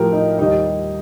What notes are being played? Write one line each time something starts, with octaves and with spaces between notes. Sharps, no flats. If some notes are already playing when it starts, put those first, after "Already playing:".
Already playing: A2 F3 G4 A#4
D#4
D#2 D#3 G3 D#4